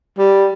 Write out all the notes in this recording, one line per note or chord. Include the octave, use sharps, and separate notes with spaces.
G3